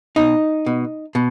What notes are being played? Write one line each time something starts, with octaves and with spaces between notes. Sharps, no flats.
B2 D#4
B2
B2